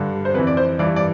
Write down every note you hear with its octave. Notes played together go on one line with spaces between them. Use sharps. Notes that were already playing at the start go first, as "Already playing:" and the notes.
Already playing: G2 D3
C5
F2 E3 B4
D5
C5
G2 E3 D5
D5